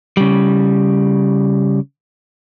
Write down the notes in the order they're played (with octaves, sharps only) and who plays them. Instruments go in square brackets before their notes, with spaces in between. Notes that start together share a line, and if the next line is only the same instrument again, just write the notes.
[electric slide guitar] C#3 G3